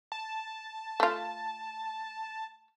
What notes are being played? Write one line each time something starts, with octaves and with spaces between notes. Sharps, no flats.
A5
A3 F4